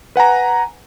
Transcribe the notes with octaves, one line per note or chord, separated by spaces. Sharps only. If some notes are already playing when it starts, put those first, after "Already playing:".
B4 F#5 G#5 A#5